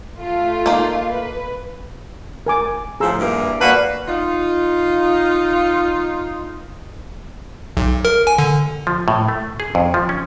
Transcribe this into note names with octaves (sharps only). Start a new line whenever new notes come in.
A3 F4
A#3 D#4
B4
A#4 G#5 D6
A2 F3 G#4 A#5 E6
G2 E3 A#3
A#3 F#4 B4 D5 A5
D#4 F4
B1
A#4
G#5
D3
F3
A2
A3
G#4
F2
F3
C#4